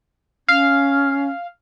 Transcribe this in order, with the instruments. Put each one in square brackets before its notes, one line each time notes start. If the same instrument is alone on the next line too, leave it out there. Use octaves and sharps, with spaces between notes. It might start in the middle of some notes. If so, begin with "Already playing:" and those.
[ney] C#4 [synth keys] F5